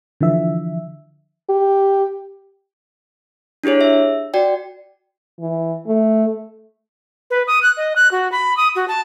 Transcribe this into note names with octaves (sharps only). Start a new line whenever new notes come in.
D3 E3 F3 E5
G4
D4 E4 G4 G#4 C#5
E5
F#4 D5 G5
E3
A3
B4
D#6
F#6
D#5
F#6
F#4
B5
D#6
F#4
A5